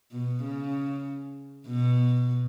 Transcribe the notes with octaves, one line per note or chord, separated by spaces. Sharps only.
B2
C#3
B2